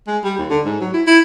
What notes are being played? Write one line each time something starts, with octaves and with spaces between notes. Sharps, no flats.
G#3
G3
D#2
D3
G#2
F#3
E4
E4